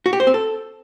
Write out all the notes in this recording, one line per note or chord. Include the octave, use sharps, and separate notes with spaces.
F#4
G4
C5
C4
A4